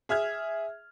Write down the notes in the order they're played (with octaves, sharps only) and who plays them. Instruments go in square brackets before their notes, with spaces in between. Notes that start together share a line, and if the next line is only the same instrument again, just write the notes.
[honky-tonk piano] G#4 E5 F6 G#6